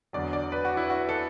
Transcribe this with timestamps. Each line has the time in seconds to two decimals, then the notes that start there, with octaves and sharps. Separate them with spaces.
0.13 E2 D3 F#3 D5
0.33 D5
0.52 B4
0.65 F#4
0.77 E4
0.90 F#4
1.09 A4